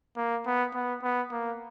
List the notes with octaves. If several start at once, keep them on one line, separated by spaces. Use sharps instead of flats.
A#3
B3
B3
B3
A#3